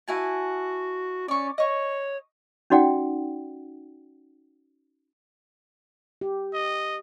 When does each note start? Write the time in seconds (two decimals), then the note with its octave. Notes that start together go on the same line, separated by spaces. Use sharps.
0.08 E4 F#4 G#5 A5
1.28 C#4 D5 C#6
1.58 C#5 D#5 C#6
2.70 C#4 D#4 F#4 D5 F#5 G5
6.21 G4
6.54 D#5